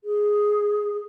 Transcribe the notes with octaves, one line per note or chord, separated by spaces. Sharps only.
G#4